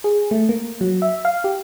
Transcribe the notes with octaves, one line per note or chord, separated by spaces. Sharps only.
G#4
A3
A#3
F#3
E5
F5
G4